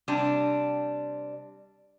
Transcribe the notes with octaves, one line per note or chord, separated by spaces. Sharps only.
C3 G3 D4